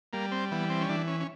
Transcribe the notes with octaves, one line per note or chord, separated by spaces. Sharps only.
G3 A#3
C4
E3 B3
C4
C#4
E3 D4
C#4
C#4